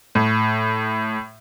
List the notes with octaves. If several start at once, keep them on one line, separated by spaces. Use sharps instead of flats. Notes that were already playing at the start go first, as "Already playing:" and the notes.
A2